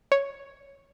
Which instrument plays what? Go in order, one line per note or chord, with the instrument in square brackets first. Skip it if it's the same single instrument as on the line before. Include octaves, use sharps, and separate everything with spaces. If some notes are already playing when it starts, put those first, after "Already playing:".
[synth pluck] C#5